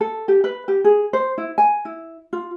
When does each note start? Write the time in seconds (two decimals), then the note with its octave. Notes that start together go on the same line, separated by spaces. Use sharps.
0.01 A4
0.28 G4
0.44 B4
0.68 G4
0.84 G#4
1.13 C5
1.38 E4
1.58 G#5
1.85 E4
2.33 F4